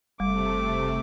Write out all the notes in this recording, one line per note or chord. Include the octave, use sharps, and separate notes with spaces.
F#1 C3 G3 A3 D6